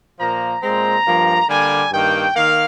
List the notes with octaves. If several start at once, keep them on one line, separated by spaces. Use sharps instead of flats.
A#2 F3 A#3 A#5
A#2 G#3 C4 A#5
G2 F3 A#3
D3 G3 A#3 G#5
G2 D#3 A#3 G5
D#3 A#3 F5